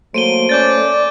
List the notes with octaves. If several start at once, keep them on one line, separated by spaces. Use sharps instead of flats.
F#3 A3 A#3 C5 D7 D#7 G7
C#4 D5 D6 G6 A6